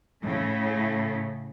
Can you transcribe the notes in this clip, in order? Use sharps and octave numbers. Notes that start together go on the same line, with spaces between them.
A2 C#3